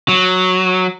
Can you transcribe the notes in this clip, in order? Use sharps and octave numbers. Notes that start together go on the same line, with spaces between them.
F#3